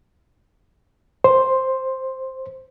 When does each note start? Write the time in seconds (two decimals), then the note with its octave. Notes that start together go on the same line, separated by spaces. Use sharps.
1.24 C5